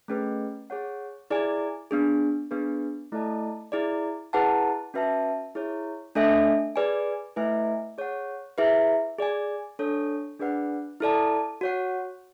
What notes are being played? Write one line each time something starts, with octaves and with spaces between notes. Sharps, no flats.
A3 C#4 G#4 B4
G#4 C#5 F#5
E4 G#4 D5 G#5
B3 D4 G#4
B3 D4 G#4 B4
A3 E4 A4 D5 A5
E4 G#4 D5
E4 G#4 B4 F#5 A5
C#4 F#4 B4 E5 A5
E4 G#4 C#5
A3 D4 A4 E5 G#5
G#4 B4 D5 G#5
A3 E4 B4 E5 G#5
G#4 C#5 F#5
E4 G#4 B4 E5
G#4 D5 G#5
D4 A4 C#5
D4 G#4 B4 D5 F#5
E4 A4 D5 A5
F#4 C#5 F#5